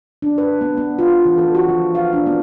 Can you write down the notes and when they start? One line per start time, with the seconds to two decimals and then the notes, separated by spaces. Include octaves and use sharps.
0.22 D4
0.38 B4
0.61 B3
0.77 B3
0.99 F4
1.25 E3
1.38 A4
1.55 F#4
1.69 F3
1.95 F5
2.13 D4
2.26 B3